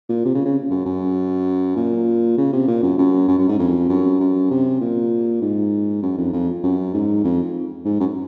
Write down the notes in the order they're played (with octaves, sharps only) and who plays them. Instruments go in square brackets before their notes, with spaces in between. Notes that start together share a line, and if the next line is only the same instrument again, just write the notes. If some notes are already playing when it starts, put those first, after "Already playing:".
[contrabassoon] A#2
C3
C#3
C#3
F#2
F#2
A#2
C#3
C3
A#2
F#2
F#2
F#2
F#2
G#2
F2
F#2
F#2
C3
A#2
G#2
F#2
F2
F2
F#2
G#2
F2
G#2
F#2